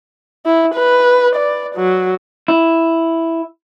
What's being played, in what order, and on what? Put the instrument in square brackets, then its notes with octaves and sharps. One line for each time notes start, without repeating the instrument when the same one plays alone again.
[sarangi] E4
B4
D5
F#3
[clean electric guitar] E4